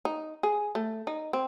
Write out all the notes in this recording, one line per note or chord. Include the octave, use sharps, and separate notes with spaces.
D#4
G#4
A3
D#4
C4